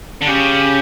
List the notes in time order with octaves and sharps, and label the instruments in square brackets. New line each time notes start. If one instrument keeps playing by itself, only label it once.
[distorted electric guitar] D3
[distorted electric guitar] C#3 [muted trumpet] G4